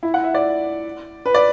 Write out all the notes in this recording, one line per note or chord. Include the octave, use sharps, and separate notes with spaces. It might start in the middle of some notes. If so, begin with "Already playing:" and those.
E4
F#5
E5
D5
B4
D5